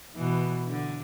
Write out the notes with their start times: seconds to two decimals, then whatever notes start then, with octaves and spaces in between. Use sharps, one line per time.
0.15 B2 E3
0.68 D3